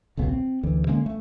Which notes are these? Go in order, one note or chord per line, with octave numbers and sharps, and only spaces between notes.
D#1 B1 C#3 B3
C4
D2 E3
D3 G#3 A#3 C#4
A3